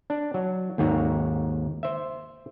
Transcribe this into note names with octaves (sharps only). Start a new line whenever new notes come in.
D4
F#3
D#2 G#2 F#4 A#5
C5 E5